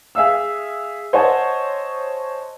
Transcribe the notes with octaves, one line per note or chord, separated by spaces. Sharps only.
G#4 E5 F5 E6
C5 C#5 D#5 F#5 G#5 A5